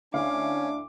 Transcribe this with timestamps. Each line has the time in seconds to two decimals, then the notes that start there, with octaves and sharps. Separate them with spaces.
0.14 D2 C#4 D4 E4 F5 D6